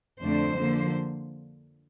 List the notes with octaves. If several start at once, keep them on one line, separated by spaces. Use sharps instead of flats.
F2 D3 A3 D4 C5
D3 F3 A#3